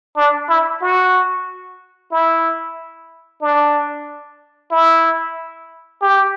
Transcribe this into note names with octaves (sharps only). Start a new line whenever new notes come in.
D4
E4
F#4
E4
D4
E4
G4